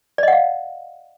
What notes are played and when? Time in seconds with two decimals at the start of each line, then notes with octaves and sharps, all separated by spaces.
0.18 D5
0.23 D#5
0.28 F#5
0.32 F5